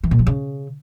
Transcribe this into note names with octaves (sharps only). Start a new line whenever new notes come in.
E3
A#2
F3
C#3